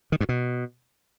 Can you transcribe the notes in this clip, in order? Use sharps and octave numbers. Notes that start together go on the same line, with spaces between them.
D#3
G2
B2